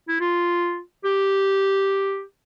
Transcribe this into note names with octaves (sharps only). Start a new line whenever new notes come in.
E4
F4
G4